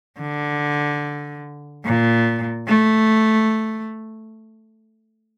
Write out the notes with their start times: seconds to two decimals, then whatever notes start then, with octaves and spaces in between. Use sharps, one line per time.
0.20 D3
1.85 A#2
2.68 A3